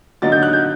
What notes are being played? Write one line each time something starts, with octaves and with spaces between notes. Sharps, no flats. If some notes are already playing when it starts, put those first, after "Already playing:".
D3 F#3 A#3 D#4 A6
G6
F#6
G6